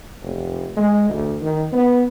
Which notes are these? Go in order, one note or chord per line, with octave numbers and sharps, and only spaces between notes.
F1
G#3
D2
D#3
B3